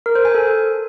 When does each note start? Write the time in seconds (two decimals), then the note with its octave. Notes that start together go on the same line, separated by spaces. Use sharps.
0.06 A#4
0.15 C5
0.25 G#5
0.35 A4